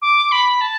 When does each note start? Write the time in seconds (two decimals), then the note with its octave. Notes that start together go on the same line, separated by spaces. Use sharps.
0.02 D6
0.32 B5
0.61 A5